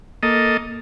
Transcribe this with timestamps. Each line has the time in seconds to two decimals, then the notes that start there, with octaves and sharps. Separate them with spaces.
0.23 A#3 A4 D#5